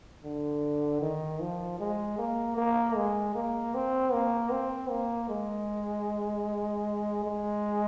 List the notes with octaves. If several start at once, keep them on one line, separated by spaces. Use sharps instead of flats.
D3
D#3
F3
G#3
A#3
A#3
G#3
A#3
C4
A#3
C4
A#3
G#3
G#3